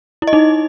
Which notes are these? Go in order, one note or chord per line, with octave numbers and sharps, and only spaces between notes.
E4
D#5
D#4